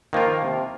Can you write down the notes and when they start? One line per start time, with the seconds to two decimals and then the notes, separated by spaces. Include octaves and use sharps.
0.13 D#3 F3 A#3 F4 A#4
0.42 C3